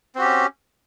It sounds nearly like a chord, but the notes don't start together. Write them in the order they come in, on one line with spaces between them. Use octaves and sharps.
C4 F#4 G4 C#4